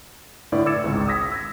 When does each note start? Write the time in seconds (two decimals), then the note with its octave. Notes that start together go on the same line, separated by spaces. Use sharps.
0.52 A2 D3 E4 B4 D5
0.66 D6 E6 G#6 A6 C#7 E7
0.84 G#1 C#2
1.08 D#6 E6 G#6 A#6 B6
1.32 E6 G#6 A#6